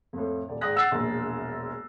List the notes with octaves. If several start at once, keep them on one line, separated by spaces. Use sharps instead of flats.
F2 A2
D#1 D5
G#2 D5 G5 D#6 F#6 A#6
F#5 E6 F#6 A6 C7
E1 A#1